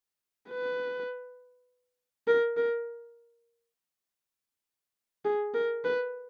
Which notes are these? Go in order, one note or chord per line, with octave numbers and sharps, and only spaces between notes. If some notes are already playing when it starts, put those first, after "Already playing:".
B4
A#4
A#4
G#4
A#4
B4